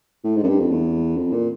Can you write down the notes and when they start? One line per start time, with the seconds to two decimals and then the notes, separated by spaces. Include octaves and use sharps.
0.24 A2
0.37 G#2
0.43 F#2
0.49 G2
0.60 F2
0.71 E2
1.17 F2
1.33 A#2